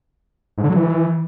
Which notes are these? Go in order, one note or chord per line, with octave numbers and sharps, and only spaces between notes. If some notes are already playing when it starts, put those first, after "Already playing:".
G#2
D3
F#3
E3